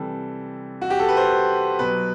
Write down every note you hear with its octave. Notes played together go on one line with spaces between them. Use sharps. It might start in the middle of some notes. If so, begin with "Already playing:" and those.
Already playing: C3 E3 G3 A4
F#4
G4
A4
B4
C5
B2 F#3 B4